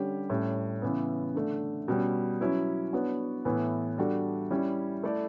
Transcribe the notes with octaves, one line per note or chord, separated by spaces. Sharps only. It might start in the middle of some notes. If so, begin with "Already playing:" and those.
Already playing: D3 G3 C#4 G4 C#5
A2 G3 C#4
C#3 E3 B3
D3 A3 D4
B2 G3 C#4
F#3 C#4 E4 B4
B3 D4 F#4 C#5
A2 E3 B3
G3 D4 F#4 A4
G3 C#4 E4
A3 E4 A4 D5